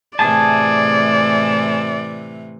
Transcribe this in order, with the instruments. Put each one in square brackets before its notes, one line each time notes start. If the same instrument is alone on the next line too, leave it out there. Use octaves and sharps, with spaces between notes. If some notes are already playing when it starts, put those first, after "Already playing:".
[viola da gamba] A2 C3 E3 [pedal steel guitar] G#4 A5 [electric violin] D5